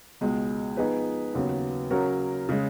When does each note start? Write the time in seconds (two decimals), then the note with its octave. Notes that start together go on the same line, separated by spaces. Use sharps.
0.21 C#2 B2 G#3
0.77 F3 B3 D#4 G#4 B4
1.34 D#2 C#3 F#3 B3 F#4
1.90 C#3 F#3 C#4 F#4 A#4
2.49 C#3 G#3